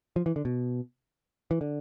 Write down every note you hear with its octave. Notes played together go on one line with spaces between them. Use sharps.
F3
E3
D3
B2
E3
D3